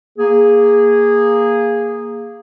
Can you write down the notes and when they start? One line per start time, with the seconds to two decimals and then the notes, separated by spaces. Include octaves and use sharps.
0.17 A#3 G#4